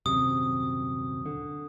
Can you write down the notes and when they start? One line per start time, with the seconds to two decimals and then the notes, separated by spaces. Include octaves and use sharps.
0.06 D#1 F#2 C3 D#6
1.26 D3